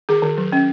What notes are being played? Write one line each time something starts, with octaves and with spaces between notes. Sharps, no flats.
D#3 G#4
D#3
F#3
C#4